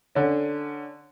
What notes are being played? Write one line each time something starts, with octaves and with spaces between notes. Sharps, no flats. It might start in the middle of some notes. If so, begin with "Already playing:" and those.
D3 C#4